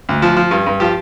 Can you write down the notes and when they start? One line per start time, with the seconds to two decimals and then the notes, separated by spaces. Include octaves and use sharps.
0.09 D2
0.22 F3
0.36 F3
0.51 G2
0.66 G2
0.80 F3 G4